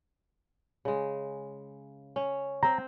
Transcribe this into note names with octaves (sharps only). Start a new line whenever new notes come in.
C#3 G#3
C#4
C4 C5 A#5